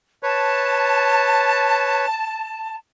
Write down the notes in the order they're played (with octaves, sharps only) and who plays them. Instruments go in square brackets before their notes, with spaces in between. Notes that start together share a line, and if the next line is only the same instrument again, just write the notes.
[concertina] B4 C#5 [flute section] A5